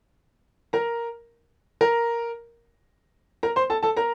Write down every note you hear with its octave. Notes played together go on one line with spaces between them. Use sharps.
A#4 A#5
A#4 A#5
A#4 A#5
C5 C6
A4 A5
A4 A5
A#4 A#5